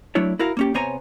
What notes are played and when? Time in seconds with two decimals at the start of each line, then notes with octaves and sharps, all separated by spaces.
0.15 F#3 A3 D4 E4 C#5
0.39 E4 F#4 A#4 F5
0.57 A#3 C#4 G4
0.74 C3 B3 C5 C#5 G#5 A#5